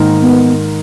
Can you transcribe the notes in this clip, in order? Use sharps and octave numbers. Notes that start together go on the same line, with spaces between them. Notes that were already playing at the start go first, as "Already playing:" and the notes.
Already playing: G#2 D#3 A#3 D#4 A#4
B3